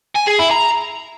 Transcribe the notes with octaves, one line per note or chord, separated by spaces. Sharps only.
G#5
G#4
E4
A#5